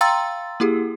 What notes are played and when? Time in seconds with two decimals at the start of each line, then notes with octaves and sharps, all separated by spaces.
0.01 F5 G5 A#5 C6 E6 A6
0.60 A#3 E4 G4 G#4